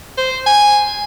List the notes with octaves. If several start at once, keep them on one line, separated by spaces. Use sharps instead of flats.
C5
G#5